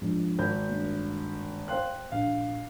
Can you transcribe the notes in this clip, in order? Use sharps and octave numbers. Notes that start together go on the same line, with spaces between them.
G#2 F3 D4
G#1 G6
G2 A#3
C5 F5 G5 C6 F#6
A#1 F5